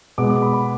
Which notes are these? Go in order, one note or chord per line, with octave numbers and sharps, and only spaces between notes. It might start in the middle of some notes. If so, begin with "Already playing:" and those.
B2 G#3 B3 D6
D6
B5
B5